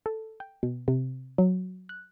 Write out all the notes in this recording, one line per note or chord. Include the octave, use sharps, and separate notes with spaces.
A4
G5
B2
C3
F#3
F#6